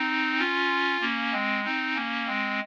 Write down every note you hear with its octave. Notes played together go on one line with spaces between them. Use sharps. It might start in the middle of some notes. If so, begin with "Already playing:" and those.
Already playing: C4 D#4
C#4 F4
A#3 C#4
G#3 C4
C4 D#4
A#3 C#4
G#3 C4